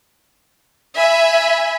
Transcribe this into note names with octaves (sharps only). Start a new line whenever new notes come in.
E5 G#5 B5